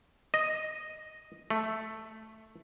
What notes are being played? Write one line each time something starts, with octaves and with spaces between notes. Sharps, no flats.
D#5
A3